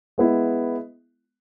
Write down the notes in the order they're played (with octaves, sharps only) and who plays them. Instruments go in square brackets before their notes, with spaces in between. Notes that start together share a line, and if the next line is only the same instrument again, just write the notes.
[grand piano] G#3 B3 E4